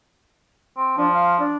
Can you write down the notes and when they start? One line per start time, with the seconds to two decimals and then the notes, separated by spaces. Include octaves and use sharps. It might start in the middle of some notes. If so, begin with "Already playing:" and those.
0.76 C4
0.97 F3 D4
1.13 F5
1.39 D4